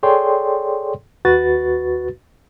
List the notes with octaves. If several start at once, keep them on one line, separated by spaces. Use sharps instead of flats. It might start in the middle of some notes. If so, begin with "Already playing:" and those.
G#4 A4 C#5 D5 G5 C6
D#2 F#4 B4 A6